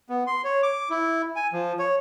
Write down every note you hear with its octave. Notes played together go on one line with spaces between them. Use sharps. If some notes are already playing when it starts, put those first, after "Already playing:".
B3
C6
C#5
D6
E4
G#5
F3
C#5